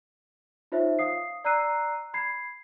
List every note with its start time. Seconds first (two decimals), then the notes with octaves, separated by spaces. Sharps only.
0.72 D#4 F4 C5 C#5 E5
0.99 F5 D#6 C7
1.44 D5 A#5 E6 F#6 C7 D#7
2.14 B5 G#6 C7